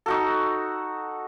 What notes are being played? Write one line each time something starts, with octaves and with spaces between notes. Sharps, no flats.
D#4 F#4 A4